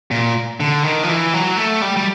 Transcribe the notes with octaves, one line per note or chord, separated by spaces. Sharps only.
A#2
D3
D#3
F3
E3
F#3
A3
G3
G3